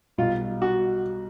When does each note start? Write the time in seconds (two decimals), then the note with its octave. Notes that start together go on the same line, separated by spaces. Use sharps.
0.18 B1 B2 G3 F4
0.62 F#4